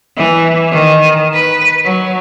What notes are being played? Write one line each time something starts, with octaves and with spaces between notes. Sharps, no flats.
E3
D#3
B4
F#3